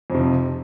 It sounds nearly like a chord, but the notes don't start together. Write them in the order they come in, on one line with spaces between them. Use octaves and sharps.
F2 C3 F3